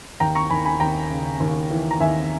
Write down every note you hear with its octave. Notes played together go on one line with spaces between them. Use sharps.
D#2 G5 A#5
A#5 C#6
D#2 G#5 B5
G#5 B5
D#2 G5 A#5
C#3
D#2
E3
A#5
D#2 E5 G#5